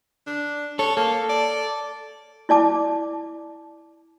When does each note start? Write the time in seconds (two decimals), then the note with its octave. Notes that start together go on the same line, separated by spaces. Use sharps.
0.26 D4
0.79 A4 C#5
0.97 A#3 A4
1.30 D5
2.49 E4 D5 A5 D6